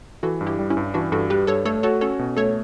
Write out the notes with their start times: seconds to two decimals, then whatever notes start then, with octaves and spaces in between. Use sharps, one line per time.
0.23 E3 F#4 A4
0.41 G2
0.46 E4 G4
0.59 G3
0.70 C#4 E4
0.77 G2
0.94 E3 D4 F#4
1.12 G2 F#4 A4
1.30 G3 G4 B4
1.47 G2 A4 C#5
1.65 A3 A4 C#5
1.83 F#4 A4 C#5
2.01 C#4 A4 C#5
2.19 B2
2.37 A3 A4 C#5